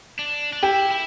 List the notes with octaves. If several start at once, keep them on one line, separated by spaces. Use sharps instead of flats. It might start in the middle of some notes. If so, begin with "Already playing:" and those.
D4
D4
E4 G4 G5
E4